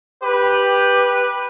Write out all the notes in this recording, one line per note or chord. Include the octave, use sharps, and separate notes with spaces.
G4 B4